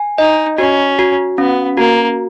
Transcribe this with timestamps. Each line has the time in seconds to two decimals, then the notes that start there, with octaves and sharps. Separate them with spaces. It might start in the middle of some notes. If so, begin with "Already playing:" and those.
Already playing: G#5
0.18 D#4 D#5
0.58 C#4 F#4
0.99 F#4
1.38 B3 C#4
1.77 A#3 F#4